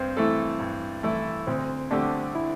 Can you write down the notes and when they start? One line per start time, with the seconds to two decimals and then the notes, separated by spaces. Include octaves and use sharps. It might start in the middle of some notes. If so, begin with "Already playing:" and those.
Already playing: G2 C4
0.17 E3 A3 E4 A4
0.59 G2
1.03 E3 A3 E4 A4
1.47 D2 C4
1.91 D3 A3 C4 D4 G4
2.35 E4